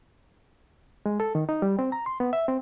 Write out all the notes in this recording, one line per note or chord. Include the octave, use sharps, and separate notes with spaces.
G#3
A4
D#3
D#4
G3
C4
A#5
C6
B3
E5
C4